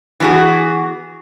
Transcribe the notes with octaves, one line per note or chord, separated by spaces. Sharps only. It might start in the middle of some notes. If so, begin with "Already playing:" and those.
E3 B3 C#4 F#4 G#4